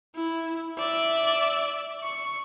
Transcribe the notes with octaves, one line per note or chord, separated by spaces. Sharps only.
E4
D5 E5
C#6